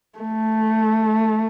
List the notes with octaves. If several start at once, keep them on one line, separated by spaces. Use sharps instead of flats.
A3